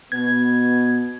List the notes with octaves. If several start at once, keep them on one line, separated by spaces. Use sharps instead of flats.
B2 B3 G#6